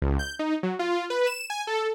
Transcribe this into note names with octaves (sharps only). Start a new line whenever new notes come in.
C#2
G6
D#4
F#3
F4
B4
E7
G#5
A4